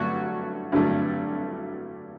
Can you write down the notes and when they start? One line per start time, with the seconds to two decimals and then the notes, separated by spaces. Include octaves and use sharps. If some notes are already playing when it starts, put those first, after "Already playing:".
Already playing: G2 D3 F#3 A3 F#4
0.72 G2 D3 F#3 A3